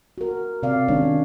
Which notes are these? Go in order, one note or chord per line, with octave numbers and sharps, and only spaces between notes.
F#4 A#4
C3 D5 F5
D#3 G#3 C#4 D4 C#5